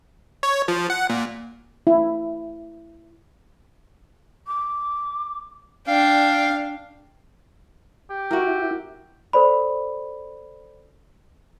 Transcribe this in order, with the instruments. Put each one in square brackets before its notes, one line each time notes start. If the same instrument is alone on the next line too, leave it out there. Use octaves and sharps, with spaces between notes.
[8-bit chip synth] C#5
F3
F#5
A#2
[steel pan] E4
[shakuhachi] D6
[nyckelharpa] D4 [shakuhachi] D5 [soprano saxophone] F5 [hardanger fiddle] G5
[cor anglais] G4
[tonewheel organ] E4 [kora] F#4 A#4
[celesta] A4 C5 D5 B5